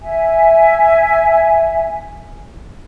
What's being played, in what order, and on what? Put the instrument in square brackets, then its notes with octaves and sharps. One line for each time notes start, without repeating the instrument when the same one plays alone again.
[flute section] E5 G#5